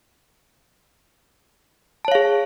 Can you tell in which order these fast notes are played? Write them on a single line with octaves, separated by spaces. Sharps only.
A5 C#5 F5 G#4